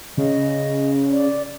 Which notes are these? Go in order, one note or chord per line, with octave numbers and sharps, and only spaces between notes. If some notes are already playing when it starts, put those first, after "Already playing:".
C#3 D#5
D5